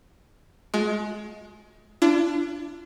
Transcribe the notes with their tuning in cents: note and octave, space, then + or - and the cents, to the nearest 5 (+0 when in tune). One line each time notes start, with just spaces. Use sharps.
G#3 +25 F4 +45
D4 +0 F4 -45